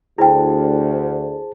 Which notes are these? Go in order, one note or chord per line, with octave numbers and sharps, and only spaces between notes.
D2 E4 G#4 C5 G5 A5